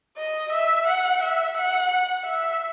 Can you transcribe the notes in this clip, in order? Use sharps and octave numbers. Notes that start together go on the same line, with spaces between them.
D#5
E5
F#5
E5
F#5
F#5
E5